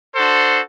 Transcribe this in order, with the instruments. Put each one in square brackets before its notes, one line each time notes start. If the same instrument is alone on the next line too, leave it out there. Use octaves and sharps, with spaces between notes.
[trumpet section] D4 F#4 A4 C5